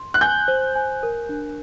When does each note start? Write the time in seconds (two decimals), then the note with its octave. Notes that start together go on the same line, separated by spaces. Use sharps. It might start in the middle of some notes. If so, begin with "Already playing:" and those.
Already playing: C6
0.14 F#6
0.21 G#5 G6
0.48 C5
0.76 G#5
1.03 A#4
1.29 D4